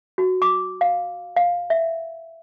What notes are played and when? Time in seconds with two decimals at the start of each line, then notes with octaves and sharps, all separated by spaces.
0.18 F#4
0.42 D6
0.81 F5
1.36 F5
1.70 E5